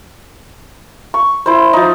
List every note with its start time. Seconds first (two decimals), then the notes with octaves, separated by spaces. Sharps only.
1.14 C#6
1.46 E4 C5
1.73 F3 D#4